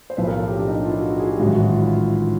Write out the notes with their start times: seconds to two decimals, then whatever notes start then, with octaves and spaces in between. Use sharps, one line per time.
0.10 C5
0.17 B1 A2 F3 B4
0.27 A#4
0.38 A4
0.48 G4
0.58 D4
0.68 D#4
0.79 D4
0.85 F4
0.89 E4
0.99 F#4
1.10 F#4
1.19 G#4
1.30 G4
1.40 A1 G#2 D#3 F#3 F#4
1.60 F#4
1.69 F4
1.79 E4
1.87 F4